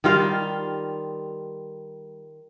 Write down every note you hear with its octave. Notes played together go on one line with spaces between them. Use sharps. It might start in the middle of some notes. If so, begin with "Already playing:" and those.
D#3 G3 F4 F5